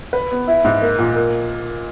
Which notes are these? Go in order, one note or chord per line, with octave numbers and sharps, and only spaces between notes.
B4
B3
E4
G#2
A#3
A#2
A#3